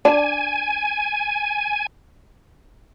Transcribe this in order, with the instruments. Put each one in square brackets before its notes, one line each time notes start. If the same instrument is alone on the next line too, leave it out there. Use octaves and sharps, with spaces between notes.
[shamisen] D4 [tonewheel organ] G#5